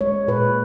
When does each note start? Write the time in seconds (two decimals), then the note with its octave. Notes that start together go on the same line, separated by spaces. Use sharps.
0.01 G#3 C#5
0.28 A#2 B4